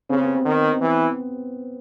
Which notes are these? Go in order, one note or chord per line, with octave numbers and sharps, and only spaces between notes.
C#3 C4
B3
C4
D#3
C4
E3 B3